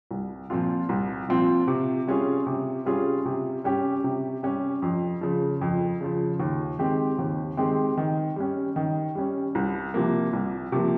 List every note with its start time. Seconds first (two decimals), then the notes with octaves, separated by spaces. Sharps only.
0.11 C2
0.50 A#2 F3 C4 F4
0.89 C2
1.28 A#2 F3 C4 F4
1.68 C3
2.07 G3 C#4 F4 G#4
2.46 C3
2.86 G3 C#4 F4 G#4
3.25 C3
3.64 G3 C#4 G4
4.04 C3
4.43 G3 C#4 G4
4.82 F2
5.21 C#3 F3
5.61 F2
6.01 C#3 F3
6.40 D#2
6.79 D#3 G#3 C4 G4
7.19 D#2
7.57 D#3 G#3 C4 G4
7.97 D#3
8.36 G3 C#4
8.76 D#3
9.15 G3 C#4
9.55 C2
9.94 C3 F3 A#3
10.33 C2
10.72 C3 F3 A#3